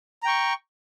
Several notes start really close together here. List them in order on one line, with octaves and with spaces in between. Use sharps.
A#5 G5 C#6